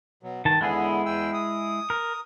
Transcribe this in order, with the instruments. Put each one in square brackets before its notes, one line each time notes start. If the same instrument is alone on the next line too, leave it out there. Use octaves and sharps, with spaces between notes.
[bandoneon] B2 F#3
[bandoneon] G2 [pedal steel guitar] D#3 A5
[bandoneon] E2 D3 B3 [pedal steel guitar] G#3 E4 G#4
[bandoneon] E2 G5 E6
D#6
[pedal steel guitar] A#4